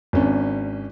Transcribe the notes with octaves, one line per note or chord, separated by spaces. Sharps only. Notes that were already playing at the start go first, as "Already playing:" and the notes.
G#1 C#4 D4